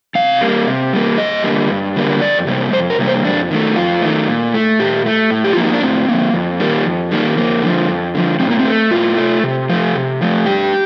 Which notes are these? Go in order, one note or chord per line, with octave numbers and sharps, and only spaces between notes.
C3 F5
G3 A#3
C3
G3 A#3
G2 D#5
D3 G3 A#3
G2
D3 G3 A#3
F2 D5
C3 G3 A#3
F2 C5
A#4
C3 G3 A#3
C5
F2 D4
D#3 A3
F2 F4
D#3 A3
A#2
A3
A#2 G4
A3
A2
G4
F3 A#3 F4
D#4
D4
A2 C4
F3 A#3
F2
D#3 G3 A#3
F2
D#3 G3 A#3
F2 A#3
D3 F3
F2
D3 F3
A2 C4
A#3
C4
A3
A2 F4
A3
C3
F3 A3
C3
F3 A3
G2 G4